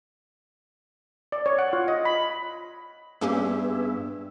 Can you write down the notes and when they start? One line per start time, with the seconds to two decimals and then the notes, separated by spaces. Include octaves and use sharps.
1.32 D5
1.46 C#5
1.59 F#5
1.73 F4
1.88 D#5
2.05 B5
3.21 G2 A#3 B3 C#4 G4 G#4 E5